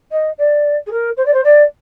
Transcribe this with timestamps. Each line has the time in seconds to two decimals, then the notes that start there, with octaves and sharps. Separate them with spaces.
0.11 D#5
0.38 D5
0.86 G#4
0.91 A#4
1.16 C5
1.25 D5
1.33 C5
1.44 D5